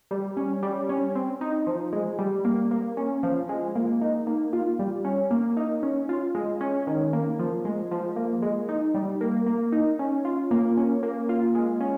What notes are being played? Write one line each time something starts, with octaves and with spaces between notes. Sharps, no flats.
G3
C#4
G3
C#4
C4
D#4
F3
G#3
G3
A#3
A#3
C#4
F3
G#3
A#3
D#4
A#3
F4
G3
C#4
A#3
D#4
C#4
F4
G#3
C#4
D#3
A#3
F3
G#3
F3
A#3
G#3
D#4
G3
A#3
A#3
D#4
C#4
F4
A#3
C#4
A#3
F4
G#3
C#4